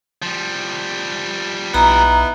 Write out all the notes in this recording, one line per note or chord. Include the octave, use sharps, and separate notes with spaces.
F3 G3
B1 B3 D#4 E4 A#5